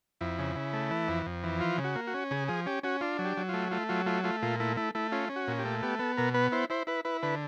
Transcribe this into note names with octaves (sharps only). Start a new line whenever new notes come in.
F2 E4
C#3
C#3
A3
E3
F2
F2
E3
F3 F4
C#3
F#4
A#3
F#4
C#4
C#3 G#4
F3 G#4
C#4 G4
C#4 F#4
D4 F4
F#3
G4
F#3
A3 F4
A3 F4
F#3 F4
A3 F4
A3 F4
A#2 F4
A3 E4
A3 E4
A3 E4
C#4 F4
C#4
F#4
A#2
G4
A3
B3 G4
B3 A4
B2 A#4
B3 B4
E4 C5
E4 C5
E4 B4
E4 B4
D3 B4